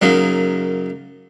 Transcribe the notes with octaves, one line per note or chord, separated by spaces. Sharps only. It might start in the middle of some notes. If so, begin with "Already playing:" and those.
F#2 C#3 F#3 A#3 D#4